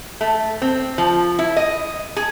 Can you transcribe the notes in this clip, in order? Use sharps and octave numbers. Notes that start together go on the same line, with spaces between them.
A3
C4
F3
E4
D#5
G#4